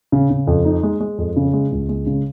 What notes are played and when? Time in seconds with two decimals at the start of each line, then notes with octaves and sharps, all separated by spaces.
0.12 C#3
0.30 C#3
0.47 F2
0.65 D#4
0.83 G#3
1.00 G#3
1.18 F2
1.36 C#3
1.53 G#3
1.72 C#2
1.89 G#3
2.06 C#3